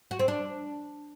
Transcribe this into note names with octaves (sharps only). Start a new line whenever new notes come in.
F#4
C4
D4